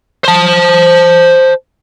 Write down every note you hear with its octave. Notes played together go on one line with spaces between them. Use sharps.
C5 A5